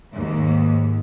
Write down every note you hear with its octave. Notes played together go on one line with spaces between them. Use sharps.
D#2 G#2